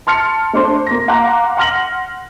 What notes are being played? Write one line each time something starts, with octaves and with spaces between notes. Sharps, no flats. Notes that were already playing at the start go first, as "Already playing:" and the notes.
A5 C6 F6 A6 C#7
A3 D4 C5 C6
A#3 A#6
F5 F#5 A#5 C6 D6 F#6
F#5 C6 F6 A#6 F#7